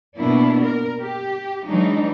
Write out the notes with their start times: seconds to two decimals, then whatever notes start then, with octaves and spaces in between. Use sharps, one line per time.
0.16 B2 A#3 B3 D4 E4
0.63 A#4
1.01 G4
1.67 E3 F#3 G#3 D4 D#4